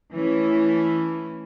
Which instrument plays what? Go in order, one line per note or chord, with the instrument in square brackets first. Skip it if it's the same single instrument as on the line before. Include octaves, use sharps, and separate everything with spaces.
[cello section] E3 A3 C#4 E4